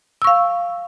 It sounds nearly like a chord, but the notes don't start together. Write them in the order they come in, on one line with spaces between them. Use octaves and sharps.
E6 C#6 F5